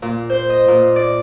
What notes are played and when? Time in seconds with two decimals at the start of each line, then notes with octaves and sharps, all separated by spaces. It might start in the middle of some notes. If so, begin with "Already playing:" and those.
0.02 A#2
0.30 C5
0.49 D#5
0.68 A#2
0.96 D5